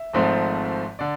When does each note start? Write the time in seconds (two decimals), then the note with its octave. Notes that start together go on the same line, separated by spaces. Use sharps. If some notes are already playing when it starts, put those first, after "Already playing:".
Already playing: E5
0.13 G#1 G#2 F3 A3 C4
0.99 D3 D5